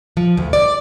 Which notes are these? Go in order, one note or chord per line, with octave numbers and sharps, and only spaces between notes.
F3
D2
D5